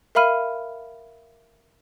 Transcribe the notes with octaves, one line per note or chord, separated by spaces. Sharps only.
A#4 E5 F5 B5 F6 D#7